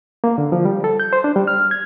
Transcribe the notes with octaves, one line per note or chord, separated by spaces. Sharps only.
A#3
D3
F3
G3
A4
G6
C5
D4
G3
F6
G#6